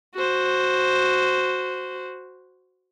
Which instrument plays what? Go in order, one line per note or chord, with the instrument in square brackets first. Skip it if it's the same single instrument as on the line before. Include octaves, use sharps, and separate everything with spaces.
[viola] F#4 C5